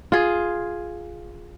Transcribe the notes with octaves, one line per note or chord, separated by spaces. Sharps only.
F4 G#4